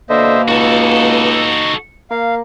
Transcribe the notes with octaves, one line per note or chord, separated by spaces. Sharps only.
B2 D3 A#3 C5 D#5 E5
C#2 D#4 F#4 A4
A#3 F5